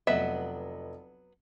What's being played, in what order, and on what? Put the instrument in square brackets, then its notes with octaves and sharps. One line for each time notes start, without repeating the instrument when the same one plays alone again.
[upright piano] F1 D#5 [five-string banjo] F#3 B3 E5